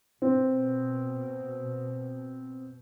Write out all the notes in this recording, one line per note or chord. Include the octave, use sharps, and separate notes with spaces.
B2 C4